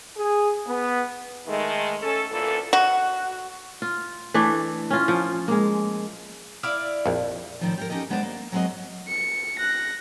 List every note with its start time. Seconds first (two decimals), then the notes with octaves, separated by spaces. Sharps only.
0.17 G#4
0.67 B3
1.47 D#3 G#3 A3
2.01 C#4 A4
2.31 D2 A#2 E3 A4
2.73 F#4
3.82 F4
4.34 E3 A3 D4 A4
4.90 C#4 F4
5.08 F3
5.48 G#3 A#3
6.63 E4 D5 F5
7.06 A#1 F2
7.61 A2 D#3 F3
7.78 G4 G#4 A#4
7.90 C#4 D#4 G4 A4 D#5
8.10 G#3 B3 D4 C5 D5
8.23 A#3
8.52 F#3 G#3 C4 F#4 A#4 D#5
9.09 C#7
9.59 F#6 A#6